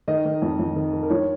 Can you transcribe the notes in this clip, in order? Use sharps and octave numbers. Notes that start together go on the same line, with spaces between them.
D#3 D#5
D#3
F2
F2
D#3
D#3
A#4
F3 C#5